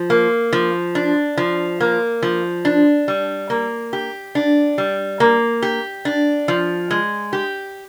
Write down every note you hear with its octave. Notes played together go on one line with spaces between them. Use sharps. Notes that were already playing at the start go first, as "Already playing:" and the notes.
Already playing: F3
A#3
F3
D4
F3
A#3
F3
D4
G3
A#3
G4
D4
G3
A#3
G4
D4
F3
G#3
G4